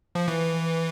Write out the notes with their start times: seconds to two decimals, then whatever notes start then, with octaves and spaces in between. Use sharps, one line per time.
0.15 F3
0.28 E3